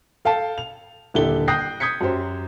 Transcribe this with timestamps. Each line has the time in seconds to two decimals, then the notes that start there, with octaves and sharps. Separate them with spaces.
0.25 A4 F5 G5 A5
0.58 F7
1.14 D#1 D3 E4 G4 A4 G7
1.48 G5 D#6 F#6 G6 A#6 C7
1.80 D#6 G6 G#6 B6 C#7
2.01 F#2 F#3 G4 C5